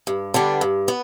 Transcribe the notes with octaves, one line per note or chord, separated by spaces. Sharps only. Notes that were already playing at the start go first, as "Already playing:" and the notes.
G2
D3 G3 B3 D4
G2
B3